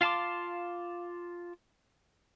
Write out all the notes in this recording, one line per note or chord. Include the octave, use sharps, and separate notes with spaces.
F4 F5 A5 C6 D6